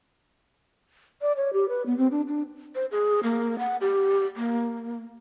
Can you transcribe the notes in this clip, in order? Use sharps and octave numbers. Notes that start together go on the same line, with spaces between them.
D5
C#5
G4
B4
B3
C4
D4
D4
C5
G#4
A#3
F#5
G4
A#3